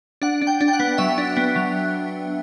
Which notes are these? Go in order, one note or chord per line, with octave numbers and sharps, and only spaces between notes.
D4 F#5
D4
G5
D4
G5
F#5
B3
F#3 E5
D4
B3
F#3